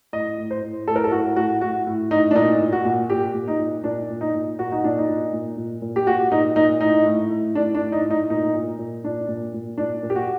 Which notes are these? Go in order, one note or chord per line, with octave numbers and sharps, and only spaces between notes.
A2 D#5
A2
C5
A2
A2 A4
A#4
A4
A2 F#4
A2 F#4
A2 F#4
A2
A2 D#4
D4
A#2 D#4
A#2
F#4
A#2
A#2 G4
A#2
D#4
A#2
A#2 D4
A#2
D#4
A#2
A#2 F#4
D#4
A#2 D4
D#4
A#2
A#2
A#2
A#2
G4
A#2 F#4
A#2 D#4
A#2 D#4
A2 D#4
A2
A2
A2 D4
D4
A2
D#4
A2
D#4
A#2 D#4
A#2
A#2
A#2 D4
A#2
A#2
A#2 D4
A#2
G4
F#4